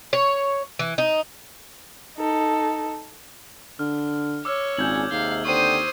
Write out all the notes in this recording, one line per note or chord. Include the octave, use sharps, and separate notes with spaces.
C#5
E3
D#4
D#4 A4
D3 F6
C#5 D6 E6 F6
G#1 A#2 C#4 G#4 G6 G#6 F#7
D#2 G#2 C3 F5 G7
D3 C4 C5 C#6 D#6 D#7